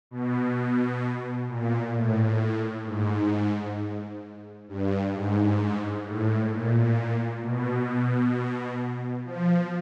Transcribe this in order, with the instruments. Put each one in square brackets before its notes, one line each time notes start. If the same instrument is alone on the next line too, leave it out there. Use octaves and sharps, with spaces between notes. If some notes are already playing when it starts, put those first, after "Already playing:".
[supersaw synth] B2
A#2
A2
G#2
G2
G#2
A2
A#2
B2
F3